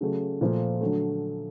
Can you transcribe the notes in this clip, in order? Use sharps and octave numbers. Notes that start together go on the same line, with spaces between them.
C#3 F#3 A3
A#2 F3 A3
D3 F#3 A3